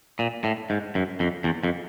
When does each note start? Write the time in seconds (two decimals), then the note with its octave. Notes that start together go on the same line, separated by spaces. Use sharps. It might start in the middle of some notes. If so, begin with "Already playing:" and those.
0.19 A#2
0.44 A2
0.70 G#2
0.95 F#2
1.20 F2
1.44 E2
1.64 F2